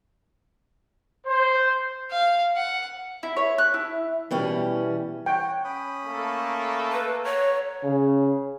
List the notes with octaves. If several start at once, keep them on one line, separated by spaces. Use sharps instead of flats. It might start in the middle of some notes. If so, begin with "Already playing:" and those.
C5
F5
F#5
E4
C#5
F#6
E4
B2 E3 G3 C#4
C#5 F#5 G5
C#4 B5 D#6
A3 A#3 A4
B4
C#5 F#5 A#5 C#6
C#3